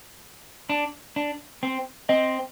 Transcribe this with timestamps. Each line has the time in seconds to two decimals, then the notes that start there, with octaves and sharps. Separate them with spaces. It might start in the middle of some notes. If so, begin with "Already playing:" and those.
0.70 D4
1.16 D4
1.63 C4
2.09 C4 D#5